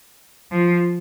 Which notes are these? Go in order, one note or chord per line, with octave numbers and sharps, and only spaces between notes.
F3